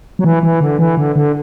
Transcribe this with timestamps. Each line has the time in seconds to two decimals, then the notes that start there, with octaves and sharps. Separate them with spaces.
0.19 F#3
0.24 E3
0.43 E3
0.61 D3
0.79 E3
0.97 D3
1.16 D3